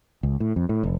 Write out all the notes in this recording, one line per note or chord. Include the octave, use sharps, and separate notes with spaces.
C#2
A2
F2
A2
F1